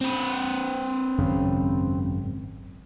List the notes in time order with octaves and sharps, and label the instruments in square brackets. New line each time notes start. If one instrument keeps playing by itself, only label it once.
[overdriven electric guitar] C4 B4
[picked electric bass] G#1 F#2 C#3